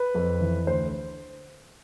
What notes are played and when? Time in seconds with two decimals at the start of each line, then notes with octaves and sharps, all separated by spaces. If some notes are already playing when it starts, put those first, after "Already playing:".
Already playing: B4
0.15 F2
0.41 E3
0.67 D2 C5